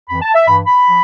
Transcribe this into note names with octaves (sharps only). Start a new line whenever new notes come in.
F2 E3 B5
A5
E5
G2 E3 B5
B5
F3